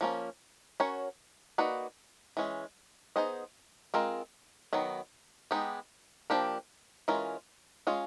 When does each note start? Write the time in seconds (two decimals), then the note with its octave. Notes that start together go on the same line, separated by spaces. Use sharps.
0.01 F3 A#3 C#4
0.80 C#4 F#4 A#4 C#5
1.58 A#3 D#4 F#4 B4 D5
2.37 E3 G#3 C#4
3.16 B3 D#4 G#4 C5 D#5
3.94 G#3 C4 F4 A#4
4.73 D#3 F#3 B3
5.51 G#3 B3 D#4 G4
6.30 F3 A#3 D4 G4 A#4
7.08 E3 G#3 C#4 F4 A#4
7.87 G#3 C#4 F4 G#4